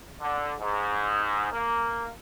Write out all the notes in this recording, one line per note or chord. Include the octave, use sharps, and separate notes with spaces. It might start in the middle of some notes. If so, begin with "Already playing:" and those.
D3
G#2
A#3